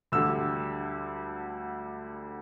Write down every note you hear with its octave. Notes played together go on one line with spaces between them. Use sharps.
D2 D3 G3 E6